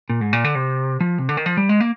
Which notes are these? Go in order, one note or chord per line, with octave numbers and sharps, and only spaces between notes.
A#2
G#2
A#2
D3
C3
F3
C3
D3
D#3
F3
G3
G#3
A#3